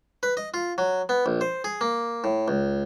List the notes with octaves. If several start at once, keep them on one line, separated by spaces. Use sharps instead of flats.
B4
D#5
F4
F#3
B3
A#1
C5
G#4
A#3
A2
C#2